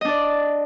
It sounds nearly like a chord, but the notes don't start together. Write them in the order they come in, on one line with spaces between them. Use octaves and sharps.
D#5 D4 D5